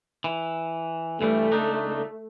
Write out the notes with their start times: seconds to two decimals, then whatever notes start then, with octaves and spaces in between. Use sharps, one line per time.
0.24 E3
1.21 G2 E3 G3 A3
1.51 C#2 D4 D#4